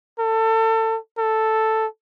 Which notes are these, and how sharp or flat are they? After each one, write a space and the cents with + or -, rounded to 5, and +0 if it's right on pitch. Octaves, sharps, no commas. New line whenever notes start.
A4 +25
A4 +0